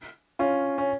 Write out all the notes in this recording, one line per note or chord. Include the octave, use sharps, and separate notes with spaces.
C#4 F4
C#4